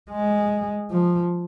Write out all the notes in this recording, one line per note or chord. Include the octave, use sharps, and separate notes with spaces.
G#3
F3